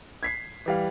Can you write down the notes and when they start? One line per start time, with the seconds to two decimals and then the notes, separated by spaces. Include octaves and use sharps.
0.23 G#6 B6 C7
0.66 E3 G3 F5